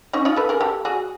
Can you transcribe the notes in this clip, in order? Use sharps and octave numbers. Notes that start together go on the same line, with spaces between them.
C#4 D#4
D#4 F4
A4 B4
G#4 A#4
G4 A4
F#4 G#4